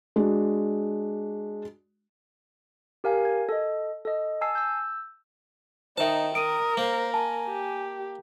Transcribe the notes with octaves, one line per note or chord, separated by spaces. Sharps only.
G#3 D4 F#4
G4 A#4 F5 G#5
G#6
A4 D#5
A4 D#5
G#5 A5 E6 C7
E6 G6
D#3 D#4 C5 E5 A5
A#4 D#6 D7 D#7
A#3 C5
G#5 A5
G4